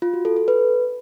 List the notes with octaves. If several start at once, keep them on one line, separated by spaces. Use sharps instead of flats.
F4
F#4
A4
A4
B4